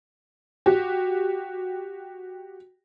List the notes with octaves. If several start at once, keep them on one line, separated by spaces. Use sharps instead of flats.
F#4 G4